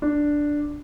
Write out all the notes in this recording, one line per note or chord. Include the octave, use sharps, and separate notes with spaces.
D4